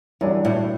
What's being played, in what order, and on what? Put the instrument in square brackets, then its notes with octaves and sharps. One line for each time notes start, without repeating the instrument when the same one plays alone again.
[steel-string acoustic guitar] F#2 [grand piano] E3 G3 D4 F#4
[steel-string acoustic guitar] A2